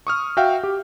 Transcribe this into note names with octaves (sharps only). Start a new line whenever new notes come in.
C#6 D#6 F6
F#4 E5 F5 G5
G4